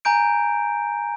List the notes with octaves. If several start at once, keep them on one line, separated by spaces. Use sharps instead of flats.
G#5 A#5 G6 D7